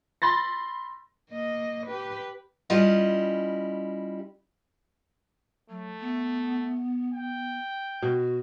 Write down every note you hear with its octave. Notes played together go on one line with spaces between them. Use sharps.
B5 C6 A6 A#6
A#3 D#5
G4 B4
G3 C#4 E4 F4 D#5
F#3 A3
B3
G5
B2 F#4